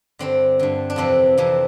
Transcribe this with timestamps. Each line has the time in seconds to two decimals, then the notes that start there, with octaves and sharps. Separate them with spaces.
0.19 G2 D3 C4
0.59 G2 D3
0.90 D4
0.96 F2 C3 E3 C4
1.38 F2 C3 E3